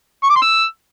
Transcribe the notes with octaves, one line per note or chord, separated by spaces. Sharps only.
C#6
D6
C6
E6